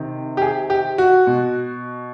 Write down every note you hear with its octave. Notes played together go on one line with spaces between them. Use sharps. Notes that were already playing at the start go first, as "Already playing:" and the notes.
Already playing: C3 D#3
G4
G#4
G4
F#4
B2